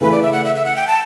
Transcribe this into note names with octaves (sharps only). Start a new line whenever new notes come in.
C#3 E3 A3 B4
D5
E5
F#5
E5
E5
F#5
G5
A5